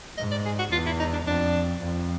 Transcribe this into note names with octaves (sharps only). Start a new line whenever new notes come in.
G#2 D#5
D5
G#4
F#4
E2 F4
E4
D#4
D4
F2 D4
F2